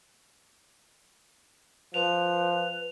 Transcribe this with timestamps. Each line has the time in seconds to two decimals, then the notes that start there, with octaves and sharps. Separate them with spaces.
1.94 F3 B4 F7